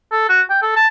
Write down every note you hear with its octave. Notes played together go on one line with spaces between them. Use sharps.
A4
F#4
G5
A4
A5